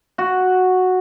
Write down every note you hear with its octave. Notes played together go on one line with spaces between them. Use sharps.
F#4